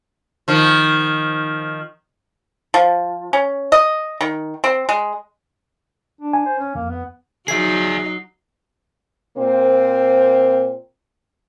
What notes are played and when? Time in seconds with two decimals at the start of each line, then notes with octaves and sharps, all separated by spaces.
0.48 D#3 F3
2.74 F3
3.33 C#4
3.72 D#5
4.21 D#3
4.64 C4
4.89 G#3
6.21 D4
6.33 G#5
6.46 C5
6.59 C#4
6.75 F2 A#3
6.89 B3
7.48 F#3 D#4 G#4 E5 C7
9.37 A#2 A#3 C4 C5